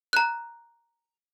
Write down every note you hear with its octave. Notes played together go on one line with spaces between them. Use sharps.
A#5 F#6